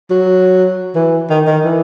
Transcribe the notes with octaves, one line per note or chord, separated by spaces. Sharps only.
F#3
E3
D#3
D#3
E3